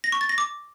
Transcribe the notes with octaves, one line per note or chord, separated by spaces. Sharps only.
A#6
C#6
A6
A#6
D6